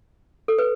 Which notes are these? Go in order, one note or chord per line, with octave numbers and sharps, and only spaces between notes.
A4
B4